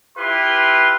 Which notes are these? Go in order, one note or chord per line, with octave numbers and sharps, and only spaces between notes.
E4 F4 G4 B4 C6